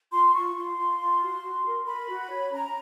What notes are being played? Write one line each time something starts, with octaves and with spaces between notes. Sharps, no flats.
F4 C6
F4 C#6
F4 C6
F4
F4
F#4
F#4
A#4
A#4 B5
F#4
C#5
C#4 A#5